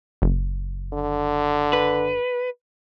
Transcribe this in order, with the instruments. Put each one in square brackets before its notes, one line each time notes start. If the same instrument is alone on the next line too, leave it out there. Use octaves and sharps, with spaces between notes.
[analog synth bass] F#1
[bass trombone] D3
[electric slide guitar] B4